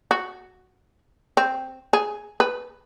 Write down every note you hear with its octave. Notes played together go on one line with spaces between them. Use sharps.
F#4
C4
G#4
B4